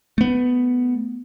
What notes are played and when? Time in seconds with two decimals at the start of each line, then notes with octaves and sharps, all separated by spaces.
0.18 A3 B3